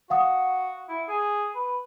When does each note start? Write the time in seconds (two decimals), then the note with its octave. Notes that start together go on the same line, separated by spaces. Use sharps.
0.10 F#4 F5 F#5 D#6
0.89 E4
1.08 G#4
1.55 B4